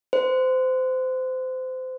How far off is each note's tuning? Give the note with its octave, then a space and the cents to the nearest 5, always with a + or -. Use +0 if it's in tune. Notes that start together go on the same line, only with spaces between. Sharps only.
C5 -25